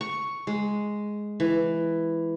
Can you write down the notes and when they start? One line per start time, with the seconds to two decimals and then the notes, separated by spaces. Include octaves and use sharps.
0.01 C#6
0.47 G#3
1.40 E3